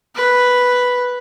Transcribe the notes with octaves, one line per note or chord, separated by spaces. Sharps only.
B4